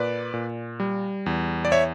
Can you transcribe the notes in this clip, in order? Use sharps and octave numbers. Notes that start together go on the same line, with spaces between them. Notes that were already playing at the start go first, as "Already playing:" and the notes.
Already playing: A#2 B4 D5
A#2
G3
E2
D5
C#5 E5